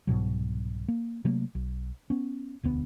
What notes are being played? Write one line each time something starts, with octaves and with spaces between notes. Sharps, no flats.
C2 G#2 B2 F#3
A#3
C3 F#3 A3 A#3
B1
B3 C#4
E1 D2 B3